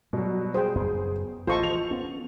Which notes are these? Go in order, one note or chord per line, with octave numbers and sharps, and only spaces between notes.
B2 F#3 G3
G#4 C5 G5
F#1 F#2 B3
A1 F4 A4 C5 D#5 A5 C#6
E3 F3 F7
B3 C#4